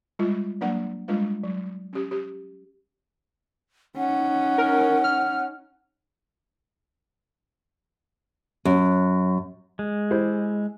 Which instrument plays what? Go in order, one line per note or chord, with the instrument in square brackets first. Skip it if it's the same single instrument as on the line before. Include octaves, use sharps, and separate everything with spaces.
[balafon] G3 G#3 F4
F#3 A#3 D4 B4 D5 F#5
G3 G#3 D4 F4 B4 F5
F#3
C#4 G4
G4
[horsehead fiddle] C#4 D#4 [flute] F#5
[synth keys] A#4
F6
[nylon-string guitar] F#2
[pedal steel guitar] G#3
[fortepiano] E4 G4 C5